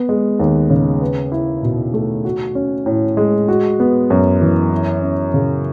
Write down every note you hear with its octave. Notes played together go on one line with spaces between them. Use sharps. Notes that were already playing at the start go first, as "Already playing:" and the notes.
Already playing: B3
G#3
D#2
C#3
B4
E4
B2
A3
F#4
C#4
A2
G#3
F#4
B3
F#2
E3
E4
C#4
C#3